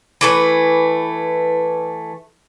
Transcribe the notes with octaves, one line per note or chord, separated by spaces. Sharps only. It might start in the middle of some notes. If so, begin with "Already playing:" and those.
E3 A3 B4